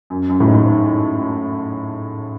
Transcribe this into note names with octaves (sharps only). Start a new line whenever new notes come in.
F#2
F#2
A2
G#2
G#2